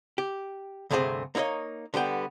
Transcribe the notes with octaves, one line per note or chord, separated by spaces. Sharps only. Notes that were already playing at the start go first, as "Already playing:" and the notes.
G4
D2 G2 C3 A3 C4 G#4
A#3 D#4 E4 C#5 D#5
D3 G3 B3 G5